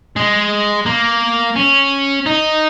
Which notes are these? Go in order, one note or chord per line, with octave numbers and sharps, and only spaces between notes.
G#3
A#3
C#4
D#4